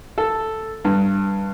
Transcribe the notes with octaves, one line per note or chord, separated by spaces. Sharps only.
A4
G2